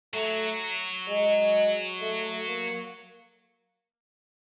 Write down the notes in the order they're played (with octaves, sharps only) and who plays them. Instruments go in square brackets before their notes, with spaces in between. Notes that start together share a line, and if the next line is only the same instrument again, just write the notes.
[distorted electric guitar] F#3 [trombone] A3
[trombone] G#3
A3
A#3